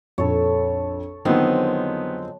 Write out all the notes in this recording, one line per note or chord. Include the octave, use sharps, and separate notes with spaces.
A#1 F2 A4 C#5
F2 D3 D#3 F#3 G#3 B3 C4